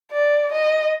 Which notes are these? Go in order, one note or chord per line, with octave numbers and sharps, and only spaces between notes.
D5
D#5